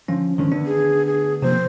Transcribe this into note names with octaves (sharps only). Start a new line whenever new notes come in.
D3 F3 C#4
G#2 D3 D#3 C#4
D2 D3 B3 D4
G#4
G#4
C3 F3 A#3 C5